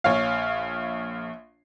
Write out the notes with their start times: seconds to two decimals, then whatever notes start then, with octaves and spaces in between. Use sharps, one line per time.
0.04 A#1 C#5 F5